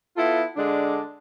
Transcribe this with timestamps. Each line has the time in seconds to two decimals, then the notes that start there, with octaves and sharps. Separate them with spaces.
0.17 B3 E4 F4 A4
0.57 D3 G#3 D4